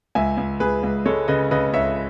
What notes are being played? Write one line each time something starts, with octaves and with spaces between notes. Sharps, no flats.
C#2 E5 G#5
C#2
C#2 G#4 B4
C#2
G#3 A4 C#5
C#3 B4 D#5
C#3 B4 D#5
C#2 C#5 E5